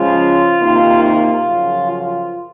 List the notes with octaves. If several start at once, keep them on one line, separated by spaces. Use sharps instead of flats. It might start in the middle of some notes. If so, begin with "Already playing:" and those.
Already playing: C#3 F3 G#3 F4
C3 D#3 A#3 D#4
F4
F#2 C#3 F3
F4